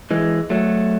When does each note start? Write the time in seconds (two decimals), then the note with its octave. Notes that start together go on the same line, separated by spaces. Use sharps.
0.11 E3 G#3
0.50 F#3 A3